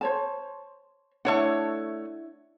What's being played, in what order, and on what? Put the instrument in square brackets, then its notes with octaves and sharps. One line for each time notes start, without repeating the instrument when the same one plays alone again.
[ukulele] C5 C#5 A5
[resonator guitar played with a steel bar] A3 C#5 F#5 [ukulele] D4 E4